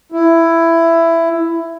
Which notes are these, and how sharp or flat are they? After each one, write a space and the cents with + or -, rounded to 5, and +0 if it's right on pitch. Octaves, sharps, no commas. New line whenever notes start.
E4 +10